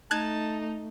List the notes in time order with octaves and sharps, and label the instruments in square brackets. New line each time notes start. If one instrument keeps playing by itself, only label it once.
[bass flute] A3 [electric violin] D#4 [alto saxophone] A5 [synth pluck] F#6 G#6